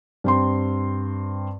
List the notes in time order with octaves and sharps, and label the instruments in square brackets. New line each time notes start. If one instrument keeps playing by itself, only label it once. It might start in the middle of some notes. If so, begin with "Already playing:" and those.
[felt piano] G2 C4 C6